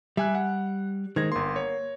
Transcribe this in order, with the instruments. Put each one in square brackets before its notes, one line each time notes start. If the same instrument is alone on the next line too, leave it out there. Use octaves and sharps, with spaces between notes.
[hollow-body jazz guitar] G3 [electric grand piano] E5 G#5 F#6
[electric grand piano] F#5
[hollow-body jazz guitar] D#3 G#3 [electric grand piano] C5 G#6 A#6
[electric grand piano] G1 C6 [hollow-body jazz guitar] A#3
[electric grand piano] C#5